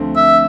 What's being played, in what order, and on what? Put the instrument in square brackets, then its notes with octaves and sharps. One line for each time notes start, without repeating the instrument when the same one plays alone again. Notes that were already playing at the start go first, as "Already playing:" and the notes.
Already playing: [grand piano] D2 D3 F3 A3 C4
[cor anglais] E5